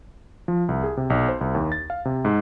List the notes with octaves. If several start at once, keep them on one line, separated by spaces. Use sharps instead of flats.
F3
C2
G#4
C3
B1
C5
C2
D#2
A6
F5
C3
G#2